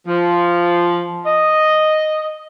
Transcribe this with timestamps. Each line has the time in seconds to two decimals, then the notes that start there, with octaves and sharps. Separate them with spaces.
0.07 F3
1.25 D#5